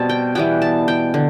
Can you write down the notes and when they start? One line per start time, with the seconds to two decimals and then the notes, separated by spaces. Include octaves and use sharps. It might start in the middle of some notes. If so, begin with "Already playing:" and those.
Already playing: B2 G3 C4 A5
0.09 G5
0.35 E3 G3 B3 G5
0.62 A5
0.88 G5
1.14 D3